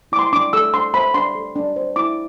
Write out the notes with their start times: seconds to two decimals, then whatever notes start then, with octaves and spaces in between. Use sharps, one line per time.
0.12 E4 D6
0.19 C6
0.33 D4 D6
0.53 A4 E6
0.73 D4 C6
0.94 C5 B5
1.14 D4 C6
1.35 A4
1.56 D4
1.76 C5
1.96 E4 D6